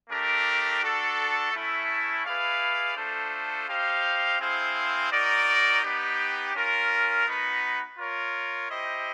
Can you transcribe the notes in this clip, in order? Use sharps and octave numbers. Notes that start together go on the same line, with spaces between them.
A3 D4 G4 A#4
D4 F#4 A4
A3 C#4 E4 A4
E4 G#4 B4 D5 F5
A3 D4 F4 A4 C5
D#4 G4 C5 F5
C4 E4 G#4 C5 F5
D#4 F#4 A#4 D5
B3 D#4 G4
C#4 F4 A#4
B3 D#4 F#4 B4
F4 A#4 C#5
E4 G4 C5 D#5